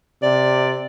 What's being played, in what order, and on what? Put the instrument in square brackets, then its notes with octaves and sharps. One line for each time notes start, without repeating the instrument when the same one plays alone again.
[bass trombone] C3 [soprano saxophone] D5